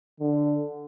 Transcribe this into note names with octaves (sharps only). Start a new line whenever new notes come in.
D3